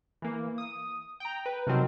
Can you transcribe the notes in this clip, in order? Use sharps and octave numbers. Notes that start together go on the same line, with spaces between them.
E3 A#3
D#6
G5 A#5
B4
C3 D#3 F3 F#3 C4